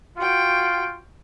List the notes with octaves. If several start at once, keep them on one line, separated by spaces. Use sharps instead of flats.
F4 F#4 G5